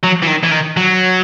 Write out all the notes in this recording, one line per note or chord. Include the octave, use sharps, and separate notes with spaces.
F#3
E3
D#3
E3
D#3
F#3